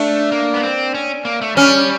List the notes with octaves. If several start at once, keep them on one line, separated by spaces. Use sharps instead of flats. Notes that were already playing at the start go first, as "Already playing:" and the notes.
Already playing: A3 D4
A#3
B3
C4
C#4
A#3
A3
G3 C#4